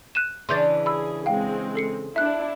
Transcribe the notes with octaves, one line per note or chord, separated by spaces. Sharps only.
F#6 D#7 E7
C#3 E3 D4 C6 G6 A6
G#4 B5 E6
G#3 C4 F5 G5
A4 C7 C#7
D4 E4 E5 F#6